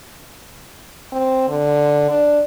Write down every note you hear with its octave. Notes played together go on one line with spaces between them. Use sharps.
C4
D3
D4